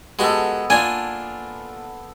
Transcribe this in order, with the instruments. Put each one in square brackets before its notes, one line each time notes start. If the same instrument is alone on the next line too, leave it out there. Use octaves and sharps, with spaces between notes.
[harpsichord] G#3 F#4 G4 [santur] B3 A4
[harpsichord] A#3 D4 F4 [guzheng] G#5